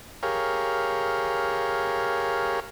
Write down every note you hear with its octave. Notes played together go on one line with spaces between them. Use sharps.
G4 G#4 A#4 C#5 F5